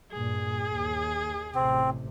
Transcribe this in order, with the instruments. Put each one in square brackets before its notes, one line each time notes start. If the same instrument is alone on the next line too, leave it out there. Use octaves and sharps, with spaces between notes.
[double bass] G2 A#2 [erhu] G#4
[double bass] D#2
[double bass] A1 C3 [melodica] C4